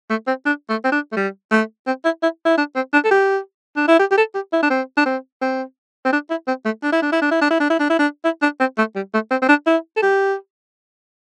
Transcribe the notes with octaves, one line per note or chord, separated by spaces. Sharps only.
A3
C4
D4
A3
C4
D4
A3
G3
A3
C4
E4
E4
E4
D4
C4
D4
A4
G4
D4
E4
G4
G4
A4
G4
E4
D4
C4
D4
C4
C4
C4
D4
E4
C4
A3
D4
E4
D4
E4
D4
E4
D4
E4
D4
E4
D4
E4
D4
E4
D4
C4
A3
G3
A3
C4
C4
D4
E4
A4
G4